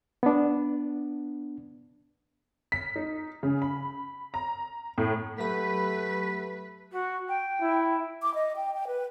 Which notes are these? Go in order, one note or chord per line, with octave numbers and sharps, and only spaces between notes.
B3 D4
B6
D#4
C#3
B5
A#5
A2
F#3 A3 G4 B4 B5
F#4
G5
E4
D6
D#5
G5
G5
B4